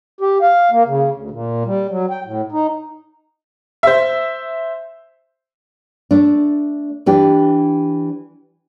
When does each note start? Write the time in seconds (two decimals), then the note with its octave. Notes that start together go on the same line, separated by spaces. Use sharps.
0.21 G4
0.41 F5
0.71 A#3
0.86 C#3
1.14 D2
1.31 A#2
1.65 G3
1.90 F#3
2.10 G5
2.26 A2
2.52 D#4
3.83 C5 E5
6.11 A3 D4
7.06 E3 D4 G4